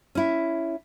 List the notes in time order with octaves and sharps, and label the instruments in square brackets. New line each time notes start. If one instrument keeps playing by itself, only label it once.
[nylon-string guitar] C#4 E4